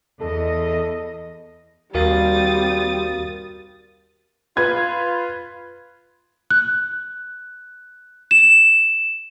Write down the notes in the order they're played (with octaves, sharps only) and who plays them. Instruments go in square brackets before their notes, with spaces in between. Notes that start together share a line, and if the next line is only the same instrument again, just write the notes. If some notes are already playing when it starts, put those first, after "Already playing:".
[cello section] E2 D#5 [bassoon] A4
[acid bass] D#2 [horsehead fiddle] G3 C4 [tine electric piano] F#4 A#4 F5 [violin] D#6 A6
[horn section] F4 [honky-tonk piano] B4 G#6
[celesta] F#6
E7